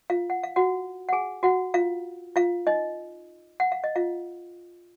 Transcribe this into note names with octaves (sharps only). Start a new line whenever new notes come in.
F4 F5
F#5
F5
F#4 F#5
F#5
G#4 G#5
F#4 F#5
F4 F5
F4 F5
D#4 D#5
F#5
F5
D#5
F4 F5